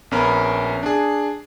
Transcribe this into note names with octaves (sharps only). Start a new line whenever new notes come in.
A#1 B3 C#4 A#4 B5
D4 G#4